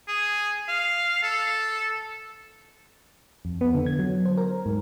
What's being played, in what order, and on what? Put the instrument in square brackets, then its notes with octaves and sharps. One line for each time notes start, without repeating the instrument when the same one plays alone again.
[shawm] G#4
F5
A4
[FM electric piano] F2
B3
D3
G#6
F#3
C5
A#4
G#2